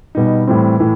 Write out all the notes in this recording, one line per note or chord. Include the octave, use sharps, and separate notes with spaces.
B2 G3 D#4
A2 E3 G3 C4
A2 E3